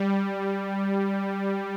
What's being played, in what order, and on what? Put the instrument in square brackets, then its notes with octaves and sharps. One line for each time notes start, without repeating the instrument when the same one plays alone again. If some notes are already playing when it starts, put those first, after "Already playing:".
Already playing: [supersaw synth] G3